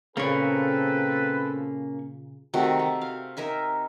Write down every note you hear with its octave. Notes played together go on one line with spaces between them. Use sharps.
A#2 C#3 A#3 C4 C#4 A4 B4 C#6
C3 D#3 A3 F#4
A3
F5
D#4 A#4 E5 G#5